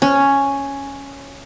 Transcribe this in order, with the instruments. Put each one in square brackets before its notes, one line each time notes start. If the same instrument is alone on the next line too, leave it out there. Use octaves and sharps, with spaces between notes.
[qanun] C#4